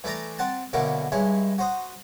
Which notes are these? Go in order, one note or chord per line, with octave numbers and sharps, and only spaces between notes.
E3 A3 D5 A#5
C4 F#5 A5
B1 B2 D3 A#3 E4 C#6
G2 G#3 E4 C#5
F#4 C5 D#6